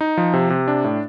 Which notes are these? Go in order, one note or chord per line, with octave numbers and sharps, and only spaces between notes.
D#4
F3
C3
C3
D4
A2